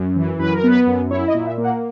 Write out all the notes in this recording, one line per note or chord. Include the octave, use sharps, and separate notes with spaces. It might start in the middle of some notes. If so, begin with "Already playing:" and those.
Already playing: F#2
E3
F#2 B4
A#4
B3 B4
F#2
E4 C#5
D#5
A#2
E5
A#3
F#5